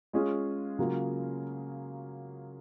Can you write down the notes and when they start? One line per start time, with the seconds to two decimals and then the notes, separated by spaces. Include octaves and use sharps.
0.13 G#3 C#4 F4 G#4
0.79 C#3 F#3 A#3 F4